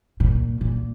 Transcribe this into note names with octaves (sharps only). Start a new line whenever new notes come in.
A#2
A#2